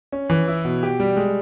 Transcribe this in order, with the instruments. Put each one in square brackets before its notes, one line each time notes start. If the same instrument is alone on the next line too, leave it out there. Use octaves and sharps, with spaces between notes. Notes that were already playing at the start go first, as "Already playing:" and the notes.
[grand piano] C#4
E3
E4
B2
G4
G3
G#3